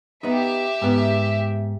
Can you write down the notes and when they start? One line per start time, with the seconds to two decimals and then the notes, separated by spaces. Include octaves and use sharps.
0.23 B3 D#4 G4 E5
0.82 G#2 B3